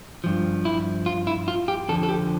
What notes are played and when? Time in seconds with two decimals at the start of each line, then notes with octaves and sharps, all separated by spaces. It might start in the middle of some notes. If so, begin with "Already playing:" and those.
0.24 G2 F3
0.65 E4
1.06 F4
1.27 E4
1.48 F4
1.68 G4
1.89 F2 D3 F3 A4
2.03 A4
2.09 G4